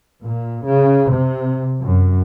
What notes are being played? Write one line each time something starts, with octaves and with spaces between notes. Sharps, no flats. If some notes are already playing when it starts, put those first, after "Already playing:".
A#2
C#3
C3
F#2